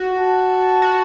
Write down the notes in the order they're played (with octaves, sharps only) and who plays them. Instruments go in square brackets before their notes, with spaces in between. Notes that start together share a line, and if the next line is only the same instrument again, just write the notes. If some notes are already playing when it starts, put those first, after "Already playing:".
Already playing: [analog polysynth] F#4
[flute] A5
[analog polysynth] F#4